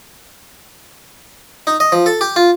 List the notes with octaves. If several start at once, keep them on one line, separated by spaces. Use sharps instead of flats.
D#4
D#5
F3
A4
G4
F4